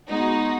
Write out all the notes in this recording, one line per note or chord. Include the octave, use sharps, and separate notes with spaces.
G#3 B3 D#4 F#4